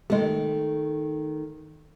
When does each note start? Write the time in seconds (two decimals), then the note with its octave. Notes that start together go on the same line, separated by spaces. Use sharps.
0.10 C3 D#3 G#3 A3